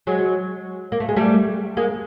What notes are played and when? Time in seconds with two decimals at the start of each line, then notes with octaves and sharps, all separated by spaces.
0.07 F#3 G#3
0.92 A#3
1.00 A3
1.09 G#3
1.16 G3 A3
1.77 G#3 A#3